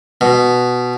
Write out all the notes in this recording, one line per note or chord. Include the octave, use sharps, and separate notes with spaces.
B2